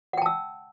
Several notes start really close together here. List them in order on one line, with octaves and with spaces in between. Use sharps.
F#5 G5 A5 E6